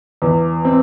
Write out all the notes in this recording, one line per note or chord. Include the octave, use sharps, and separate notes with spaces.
E2
C4